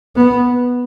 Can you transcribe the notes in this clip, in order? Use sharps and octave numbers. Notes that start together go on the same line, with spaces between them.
B3